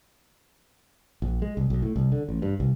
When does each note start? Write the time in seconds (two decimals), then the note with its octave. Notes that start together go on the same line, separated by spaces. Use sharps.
1.22 A#1
1.42 G#3
1.57 C2
1.70 B1
1.82 A2
1.96 C2
2.12 D3
2.29 A1
2.42 G2
2.60 C2